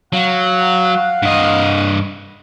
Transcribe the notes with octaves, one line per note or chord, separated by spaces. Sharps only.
F#3 F5 F#5
G2 D#5